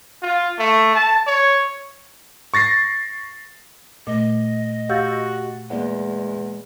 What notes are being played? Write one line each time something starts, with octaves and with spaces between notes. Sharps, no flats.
F4
A3
A5
C#5
C#6 A6 A#6 C7
A#2 A3 D#5
F#4 G4 F5 E6 G6 A6
E2 G#3 A#3 D5 F#5